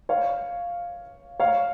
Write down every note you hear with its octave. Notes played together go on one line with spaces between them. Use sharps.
C#5 F5
C#5 F5